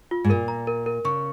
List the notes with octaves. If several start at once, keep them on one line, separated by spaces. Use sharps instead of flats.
F4
G#2
A#2 A#4
A#5
A#4
A#4
C#3 C#6